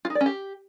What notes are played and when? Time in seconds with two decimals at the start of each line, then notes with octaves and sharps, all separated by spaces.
0.05 F4
0.10 D#4
0.15 D5
0.21 C#4
0.26 G4